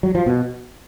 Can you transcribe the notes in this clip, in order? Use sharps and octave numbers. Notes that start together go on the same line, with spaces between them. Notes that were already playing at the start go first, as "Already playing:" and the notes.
F#3
F3
B2